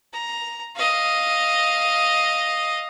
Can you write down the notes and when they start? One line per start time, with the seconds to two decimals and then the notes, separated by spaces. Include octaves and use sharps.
0.13 A#5
0.76 D#5 F5